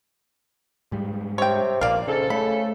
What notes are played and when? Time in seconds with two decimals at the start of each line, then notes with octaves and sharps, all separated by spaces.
0.92 G#2 G3
1.38 C3 C#5 G5
1.81 A#1 A#3 D5 F5
2.08 G#2 C#3 A4
2.30 C#3 A3 B5